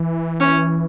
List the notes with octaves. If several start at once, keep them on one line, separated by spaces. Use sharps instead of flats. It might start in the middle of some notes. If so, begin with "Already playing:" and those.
Already playing: E3
C#4